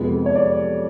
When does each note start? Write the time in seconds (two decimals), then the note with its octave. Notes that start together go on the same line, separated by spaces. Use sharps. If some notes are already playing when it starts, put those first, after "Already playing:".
Already playing: F2 C3 F3 G#3 B3
0.26 C#5
0.35 D5